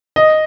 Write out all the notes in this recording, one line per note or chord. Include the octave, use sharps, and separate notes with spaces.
D#5